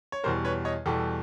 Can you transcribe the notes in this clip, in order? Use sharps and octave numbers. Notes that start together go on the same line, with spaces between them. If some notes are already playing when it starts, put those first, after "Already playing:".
C#5
E2 B2 G3 A#4 C5
B4 C#5
C#5 D#5
E2 B2 G3 G4 A4